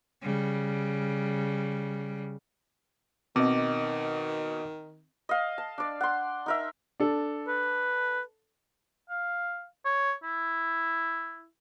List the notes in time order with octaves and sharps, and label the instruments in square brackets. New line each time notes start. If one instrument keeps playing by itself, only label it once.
[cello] C#3 G3
[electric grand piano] B2 [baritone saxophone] D#3 [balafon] C4 [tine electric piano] D#5 D6
[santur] D#5 F5
A5
D4 D5
F#5 C6
D#4 A#4 E5
[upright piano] D4 A4
[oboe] B4
F5
C#5
E4